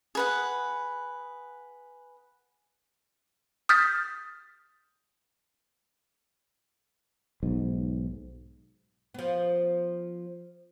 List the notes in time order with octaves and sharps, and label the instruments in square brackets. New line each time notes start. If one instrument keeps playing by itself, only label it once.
[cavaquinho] G#4 B4 F#5
[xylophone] D#6 F6 G6 A6 B6
[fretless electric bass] B1 G#2
[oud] F3 B3